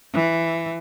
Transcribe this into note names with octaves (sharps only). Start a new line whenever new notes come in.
E3